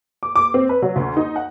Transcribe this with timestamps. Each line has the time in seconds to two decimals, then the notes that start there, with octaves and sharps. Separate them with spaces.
0.23 D6
0.36 D6
0.54 C4
0.69 B4
0.82 F#3
0.96 D2
1.17 D#4
1.36 F#5